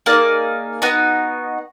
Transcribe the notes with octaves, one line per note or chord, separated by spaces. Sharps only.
A#3 D#4 G#4 D5
B3 D#4 F#4